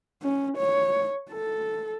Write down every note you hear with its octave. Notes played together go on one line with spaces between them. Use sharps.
C#4
C#5
A4